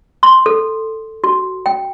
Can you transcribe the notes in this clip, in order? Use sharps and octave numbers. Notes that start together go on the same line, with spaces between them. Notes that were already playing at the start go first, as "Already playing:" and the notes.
C6
A4
F#4
G5